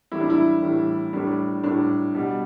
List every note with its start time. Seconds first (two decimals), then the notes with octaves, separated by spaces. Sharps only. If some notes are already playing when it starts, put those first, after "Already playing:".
0.12 A2 E3 G3 E4
0.21 D4
0.30 E4
0.63 A2 E3 G3
1.13 A2 G3 D4
1.64 A2 G3 D4
2.15 B2 G3